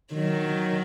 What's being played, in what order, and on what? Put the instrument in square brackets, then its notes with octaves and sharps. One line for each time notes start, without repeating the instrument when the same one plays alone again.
[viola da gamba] D#3 F#3